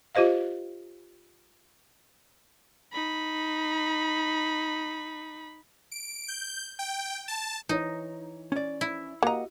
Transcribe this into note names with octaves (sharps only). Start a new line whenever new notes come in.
F4 G4 C5 D#5 F5
D#4 B5
D7
G6
G5
A5
E3 D#4 C#5
C#4 D5
E4
A#3 F#4 G4 D#5 F#5 A#5